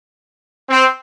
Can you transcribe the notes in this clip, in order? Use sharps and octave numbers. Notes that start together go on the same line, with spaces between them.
C4